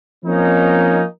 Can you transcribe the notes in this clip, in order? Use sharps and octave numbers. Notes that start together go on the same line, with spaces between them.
F3 A#3 C4 C#4 D#4